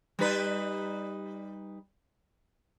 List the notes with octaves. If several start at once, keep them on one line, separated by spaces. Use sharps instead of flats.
G3 D#4 B4